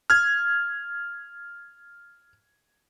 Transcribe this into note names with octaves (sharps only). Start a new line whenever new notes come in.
F6 G#6